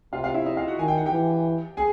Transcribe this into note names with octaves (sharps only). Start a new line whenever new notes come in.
C3 F4 F5
F4 F5
E4 E5
D#4 D#5
F4 F5
F#4 F#5
D#3 G#5
G5
F#5
G4 G5
E3
G#4 G#5